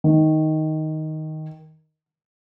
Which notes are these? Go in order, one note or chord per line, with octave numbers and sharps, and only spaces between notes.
D#3